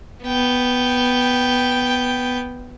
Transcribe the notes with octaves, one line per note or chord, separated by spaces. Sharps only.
B3 G5